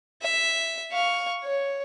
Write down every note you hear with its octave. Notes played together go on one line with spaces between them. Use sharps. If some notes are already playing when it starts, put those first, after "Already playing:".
E5
F5 C#6
C#5